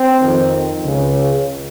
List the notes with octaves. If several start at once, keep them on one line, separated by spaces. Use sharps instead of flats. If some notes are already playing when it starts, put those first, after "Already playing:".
Already playing: C4
F2 D#3
C#2 C#3